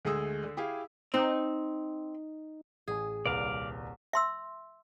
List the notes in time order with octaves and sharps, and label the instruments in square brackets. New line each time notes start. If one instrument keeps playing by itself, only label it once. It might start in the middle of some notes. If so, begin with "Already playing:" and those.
[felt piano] D2 G#3 A3 G#4 D#6 E6
D3
E4 G4 G#4 F5
[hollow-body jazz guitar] C4 [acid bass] D#4
[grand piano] A1 G#5 [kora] G#4
[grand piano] D#1 C2 B4 [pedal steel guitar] D5 F5
[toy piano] E5 C6 E6